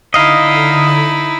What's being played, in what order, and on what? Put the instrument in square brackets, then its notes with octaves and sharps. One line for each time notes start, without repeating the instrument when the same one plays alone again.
[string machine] D3 [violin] D#4 E4 [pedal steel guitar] D#5 F5